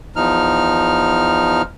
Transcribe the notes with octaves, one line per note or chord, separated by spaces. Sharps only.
E2 F3 D#4 F6